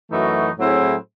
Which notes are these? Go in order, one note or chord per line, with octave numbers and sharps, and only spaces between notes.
F#2 E3 A3 D#4 F#4
A2 F#3 C4 E4 G#4